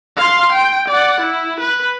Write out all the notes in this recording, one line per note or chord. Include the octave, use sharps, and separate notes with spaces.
F5 C6
G5
D5 F#5
E4
B4